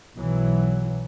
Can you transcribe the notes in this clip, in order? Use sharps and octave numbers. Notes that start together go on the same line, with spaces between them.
B1 E3 F#3